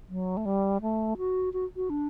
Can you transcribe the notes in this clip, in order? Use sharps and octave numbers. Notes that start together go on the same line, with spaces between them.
F#3
A3
G3
A3
F#4
F#4
F#4
D4